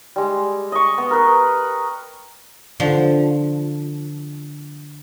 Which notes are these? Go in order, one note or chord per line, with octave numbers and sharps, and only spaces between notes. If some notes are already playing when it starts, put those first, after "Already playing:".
G3 G#3
D#5 C#6
B3
A#4 B4
D3 F3